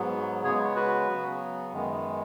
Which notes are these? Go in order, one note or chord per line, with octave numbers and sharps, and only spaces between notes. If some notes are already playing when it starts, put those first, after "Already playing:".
Already playing: G#2 F#3 B3
C#3 G#3 B3 G#4 C#5
F#4 B4
C#3 F#3 B3
F#2 D#3 G#3 B3